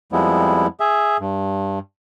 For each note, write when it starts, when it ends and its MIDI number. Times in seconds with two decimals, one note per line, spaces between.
0.12 0.67 41
0.12 0.67 53
0.12 0.67 55
0.12 0.67 56
0.12 0.67 59
0.12 0.67 64
0.80 1.17 68
0.80 1.17 76
1.20 1.79 43